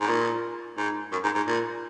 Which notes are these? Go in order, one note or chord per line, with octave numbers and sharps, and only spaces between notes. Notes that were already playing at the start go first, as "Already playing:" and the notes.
G#2
A#2
G#2
F#2
G#2
G#2
A#2